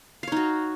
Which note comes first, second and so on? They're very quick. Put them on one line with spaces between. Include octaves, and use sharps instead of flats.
F5 C#5 D#4 F#4